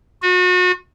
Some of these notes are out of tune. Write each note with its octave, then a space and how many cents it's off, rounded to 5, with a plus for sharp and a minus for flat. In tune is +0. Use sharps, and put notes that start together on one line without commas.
F#4 -35